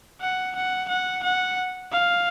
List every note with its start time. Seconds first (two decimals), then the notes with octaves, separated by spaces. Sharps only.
0.21 F#5
0.55 F#5
0.89 F#5
1.23 F#5
1.92 F5